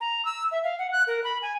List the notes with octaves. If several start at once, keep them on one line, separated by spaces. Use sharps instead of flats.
A#5
E6
E5
F5
F#5
F#6
A#4
B5
G#5